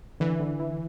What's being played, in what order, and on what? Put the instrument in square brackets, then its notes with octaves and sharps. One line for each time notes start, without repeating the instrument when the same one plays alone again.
[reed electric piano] D3 [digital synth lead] E3
[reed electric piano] D3
E4